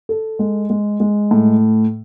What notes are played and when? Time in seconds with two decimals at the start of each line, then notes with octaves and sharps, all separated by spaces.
0.09 A4
0.39 G#3
0.70 G#3
1.00 G#3
1.31 A2